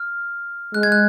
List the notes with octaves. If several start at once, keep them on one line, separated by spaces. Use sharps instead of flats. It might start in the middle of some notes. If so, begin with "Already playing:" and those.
Already playing: F6
G#3 F#6
G#6
F#6